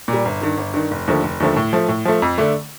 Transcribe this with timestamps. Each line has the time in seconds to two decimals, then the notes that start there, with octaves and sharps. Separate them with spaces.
0.08 A#2
0.13 G3
0.25 G1
0.41 G2 D#3
0.57 G1
0.74 G2 D#3
0.91 F1
1.08 D#2 D3 F3 A3
1.23 F1
1.40 D#2 D3 F3 A3
1.56 A2
1.73 F3 A3
1.88 A2
2.05 F3 A3
2.22 F2
2.38 D3 A3 D4